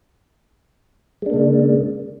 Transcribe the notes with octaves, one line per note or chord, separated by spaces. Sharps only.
C#3 G#3 A#3 D4